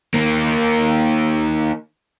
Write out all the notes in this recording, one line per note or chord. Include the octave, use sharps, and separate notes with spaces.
D#3 A#3